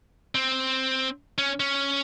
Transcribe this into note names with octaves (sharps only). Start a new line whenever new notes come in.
C4
C#4
C#4